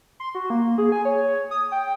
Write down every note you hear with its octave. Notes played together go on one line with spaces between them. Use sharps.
C6
F#4
A#3
G#4
G#5
C#5
D#6
G5